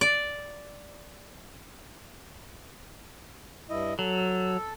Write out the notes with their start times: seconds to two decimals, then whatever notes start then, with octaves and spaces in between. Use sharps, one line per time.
0.01 D5
3.70 G2 E4 D#5
3.99 F#3 A4